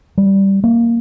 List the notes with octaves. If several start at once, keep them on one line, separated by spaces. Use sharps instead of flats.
G3
A#3